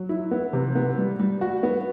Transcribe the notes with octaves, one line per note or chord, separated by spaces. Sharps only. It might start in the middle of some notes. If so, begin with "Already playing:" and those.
Already playing: F#3
E4
B3
C3
B3
G3
G3
F#4
B3